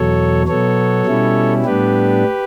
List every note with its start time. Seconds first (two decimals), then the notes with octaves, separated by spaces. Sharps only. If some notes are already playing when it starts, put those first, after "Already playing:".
Already playing: E2 B2 F#3 A4 C#5
0.47 B2 F#3 B3 A4 C#5
1.06 B2 G3 C#4 E4
1.64 A2 G3 B3 D4 G4 B4